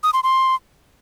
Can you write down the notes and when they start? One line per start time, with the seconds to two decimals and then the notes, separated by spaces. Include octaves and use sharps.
0.03 D#6
0.13 C6
0.23 C6